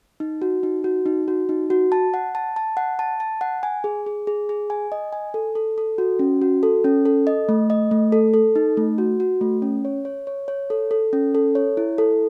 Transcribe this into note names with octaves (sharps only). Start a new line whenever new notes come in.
D#4
F#4
D#4
F#4
D#4
F#4
D#4
F#4
A5
F#5
A5
A5
F#5
A5
A5
F#5
G#5
G#4
G#4
G#4
G#4
G#5
D#5
G#5
A4
A4
A4
F#4
C#4
F#4
A4
C#4
A4
D#5
A3
D#5
A3
A4
A4
D#4
A3
F#4
F#4
A3
C#4
C#5
C#5
C#5
C#5
A4
A4
C#4
A4
C#5
E4
A4